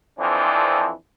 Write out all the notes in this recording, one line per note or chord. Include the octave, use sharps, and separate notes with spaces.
F2 D3 E3 F3 C4 D4